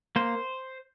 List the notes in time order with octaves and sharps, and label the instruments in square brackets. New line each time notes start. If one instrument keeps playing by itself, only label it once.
[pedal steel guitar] A#3 C5